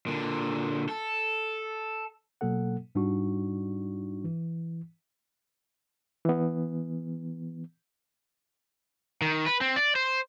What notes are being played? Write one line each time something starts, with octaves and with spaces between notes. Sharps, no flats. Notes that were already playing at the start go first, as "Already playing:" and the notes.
A#2 D3
A4
B2 F#3 A#3 A4 F#5
G#2 G3 D4 D#4 F#4 C#6
E3
E3 B3
D#3
B4
C4
D5
C5